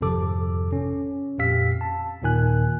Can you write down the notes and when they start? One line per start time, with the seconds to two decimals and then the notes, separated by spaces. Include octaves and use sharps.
0.01 G#1 F2 C3 F3 A4 D6
0.72 C#4
1.39 F2 A#2 G4 F5 E6 B6
1.81 A5
2.22 D#2 A#2 D#3 G#5 F#6